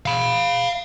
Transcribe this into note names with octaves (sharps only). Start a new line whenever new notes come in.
F5 B5